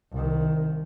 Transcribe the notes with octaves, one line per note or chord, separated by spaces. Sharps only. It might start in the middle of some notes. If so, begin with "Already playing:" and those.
C2 D#3